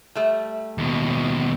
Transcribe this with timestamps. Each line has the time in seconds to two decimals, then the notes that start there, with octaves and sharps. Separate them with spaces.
0.15 G3 A3
0.78 D#2 B2